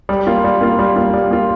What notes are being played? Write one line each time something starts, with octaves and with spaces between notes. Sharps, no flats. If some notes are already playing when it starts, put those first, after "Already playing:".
G3
A#3 F4
G3
A#3 F4
G3
A#3 F4
G3
A#3 F4